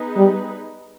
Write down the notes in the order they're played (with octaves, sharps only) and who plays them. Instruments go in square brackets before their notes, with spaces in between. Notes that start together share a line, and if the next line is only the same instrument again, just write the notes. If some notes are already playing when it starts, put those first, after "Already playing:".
Already playing: [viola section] B3 D#4 G#4 B4
[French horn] G3